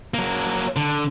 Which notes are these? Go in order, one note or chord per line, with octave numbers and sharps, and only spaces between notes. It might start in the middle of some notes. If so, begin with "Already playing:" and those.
F#3 A#3
D3